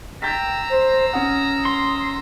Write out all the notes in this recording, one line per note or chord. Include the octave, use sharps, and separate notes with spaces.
G5 A#5 E6 G6 A6 B6
C5
C#4 F#5 D#6
C6